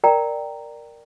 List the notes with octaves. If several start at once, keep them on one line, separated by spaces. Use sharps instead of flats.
A#4 D5 G5 A#5